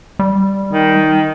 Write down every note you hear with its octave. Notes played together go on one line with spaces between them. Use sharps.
G3
D#3